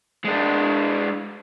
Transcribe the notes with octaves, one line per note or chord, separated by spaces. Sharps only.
G#3 D4